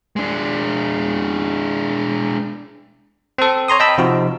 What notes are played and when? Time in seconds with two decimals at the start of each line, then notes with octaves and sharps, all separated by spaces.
0.16 G#3 D4
3.38 C4 A4
3.68 C#5 A#5 C6 D#6
3.80 D#5 G5 A5 B5 E6
3.98 C3 F3 D#4 F#4